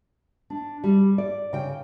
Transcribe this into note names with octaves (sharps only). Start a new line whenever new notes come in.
D4
G3
D5
C#3 G5